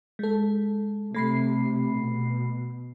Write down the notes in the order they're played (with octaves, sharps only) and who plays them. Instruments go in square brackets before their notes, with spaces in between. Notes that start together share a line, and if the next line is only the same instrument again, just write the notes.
[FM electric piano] G#3 A4
[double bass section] C3 [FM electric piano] A3 B5 C7
[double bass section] B2